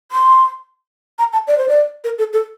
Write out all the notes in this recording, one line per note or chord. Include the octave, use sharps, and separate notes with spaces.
C6
A#5
A5
D5
C5
D5
A#4
A4
A4